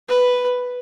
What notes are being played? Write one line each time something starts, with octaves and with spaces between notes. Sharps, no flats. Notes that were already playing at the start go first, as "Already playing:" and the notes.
B4